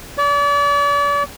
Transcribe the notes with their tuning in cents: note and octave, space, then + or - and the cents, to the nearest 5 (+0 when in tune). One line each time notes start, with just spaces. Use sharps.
D5 -40